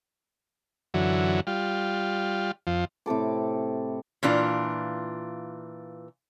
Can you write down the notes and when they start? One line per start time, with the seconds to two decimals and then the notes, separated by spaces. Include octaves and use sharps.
0.94 F#2 D3 E3 F#3
1.47 G3 F4
2.67 F2 F3
3.06 A2 C3 A4 D6
4.23 A#2 E3 D4 F4